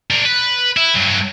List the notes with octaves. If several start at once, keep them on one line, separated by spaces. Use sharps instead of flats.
D4 A#4
B4
E4
G2 F#3